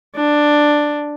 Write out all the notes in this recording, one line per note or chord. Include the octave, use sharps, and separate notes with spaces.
D4